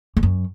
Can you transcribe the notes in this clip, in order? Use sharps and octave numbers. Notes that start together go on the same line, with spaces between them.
E2
F#2